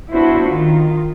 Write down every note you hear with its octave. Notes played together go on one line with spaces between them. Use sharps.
B3 D4 E4 F#4 C5
D#3 F4